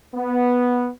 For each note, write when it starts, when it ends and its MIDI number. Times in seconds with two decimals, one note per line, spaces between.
0.15 0.88 59